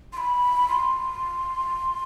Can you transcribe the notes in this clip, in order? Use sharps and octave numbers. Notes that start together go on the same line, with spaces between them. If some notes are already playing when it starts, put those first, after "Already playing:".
C6
B5
C6